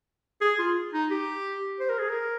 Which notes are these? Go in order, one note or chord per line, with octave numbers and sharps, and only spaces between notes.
G#4
F4
D#4
G4
C5
A#4
G#4
A#4